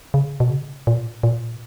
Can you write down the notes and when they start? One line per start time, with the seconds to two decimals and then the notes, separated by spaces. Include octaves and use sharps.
0.14 C#3
0.40 B2
0.50 C#3
0.87 A#2
1.23 A#2